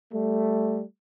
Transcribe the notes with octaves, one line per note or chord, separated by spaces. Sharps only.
G3 A3